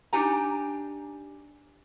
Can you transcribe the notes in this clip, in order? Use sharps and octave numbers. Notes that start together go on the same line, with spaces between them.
D4 D#4 G4 G#5 A#5